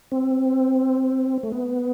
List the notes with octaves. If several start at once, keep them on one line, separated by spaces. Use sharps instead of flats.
C4
A3
B3